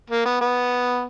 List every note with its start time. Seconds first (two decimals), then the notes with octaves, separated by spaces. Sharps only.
0.10 A#3
0.25 B3
0.41 B3